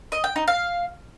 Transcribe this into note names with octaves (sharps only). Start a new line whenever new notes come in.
D#5
G5
D#4
F5